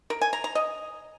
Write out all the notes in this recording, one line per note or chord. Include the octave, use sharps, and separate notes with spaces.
A#4
G#5
A#5
A#5
D#5